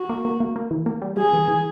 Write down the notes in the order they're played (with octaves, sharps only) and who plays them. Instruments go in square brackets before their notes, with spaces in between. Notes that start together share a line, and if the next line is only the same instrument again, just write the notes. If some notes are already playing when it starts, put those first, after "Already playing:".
Already playing: [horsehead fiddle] F#4
[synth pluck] A#3
A#3
A#3
A#3
E3
A#3
G3
[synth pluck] G3 [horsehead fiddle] G#4
[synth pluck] E3
E3